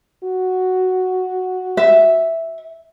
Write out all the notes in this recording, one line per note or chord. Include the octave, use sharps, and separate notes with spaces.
F#4
E5